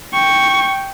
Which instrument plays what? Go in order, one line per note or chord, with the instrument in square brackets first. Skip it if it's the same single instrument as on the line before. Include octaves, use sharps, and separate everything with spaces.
[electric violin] G5 C#6